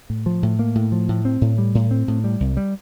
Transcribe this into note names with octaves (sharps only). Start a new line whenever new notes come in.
A2
F3
A2
A#3
A2
F3
A2
C4
A2
G3
A2
C4
A2
G3
C2
G3